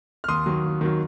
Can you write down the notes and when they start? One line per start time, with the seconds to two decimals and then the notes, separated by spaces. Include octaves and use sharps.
0.24 F6
0.28 D#2 C6 D#6
0.46 D#3 F#3
0.64 D#2
0.81 D#3 F#3